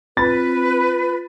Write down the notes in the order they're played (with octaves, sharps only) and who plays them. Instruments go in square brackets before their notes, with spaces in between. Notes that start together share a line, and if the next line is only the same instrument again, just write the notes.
[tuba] C4 [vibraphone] F4 [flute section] B4 [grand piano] B5 A6